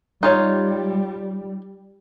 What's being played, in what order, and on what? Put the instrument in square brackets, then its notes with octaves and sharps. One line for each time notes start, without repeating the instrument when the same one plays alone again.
[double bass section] G3 [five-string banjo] D#4 F4 C#5